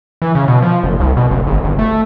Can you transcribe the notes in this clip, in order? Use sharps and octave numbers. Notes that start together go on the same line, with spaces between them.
E3
C#3
B2
F3
F#1
C2
B2
F#1
G#1
G1
A3